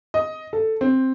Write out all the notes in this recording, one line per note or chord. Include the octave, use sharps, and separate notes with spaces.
D#5
A4
C4